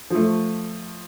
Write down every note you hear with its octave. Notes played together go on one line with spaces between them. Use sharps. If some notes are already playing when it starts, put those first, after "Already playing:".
F3 A3